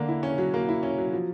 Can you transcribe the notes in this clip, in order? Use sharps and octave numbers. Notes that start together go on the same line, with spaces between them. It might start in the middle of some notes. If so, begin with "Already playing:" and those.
Already playing: D3 A#3
E4
C#4
F#3
A#3
E4
C#4
F#3
F3